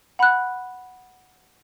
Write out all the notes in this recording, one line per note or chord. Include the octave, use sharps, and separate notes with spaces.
F#5 B5 F#6